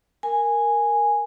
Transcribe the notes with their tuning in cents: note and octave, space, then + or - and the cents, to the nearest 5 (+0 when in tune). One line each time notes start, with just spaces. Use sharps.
A#4 +0 G#5 -5